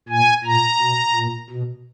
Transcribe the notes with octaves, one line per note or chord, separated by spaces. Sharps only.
A#2 G#5
A#2 A#5
B2
A#2
B2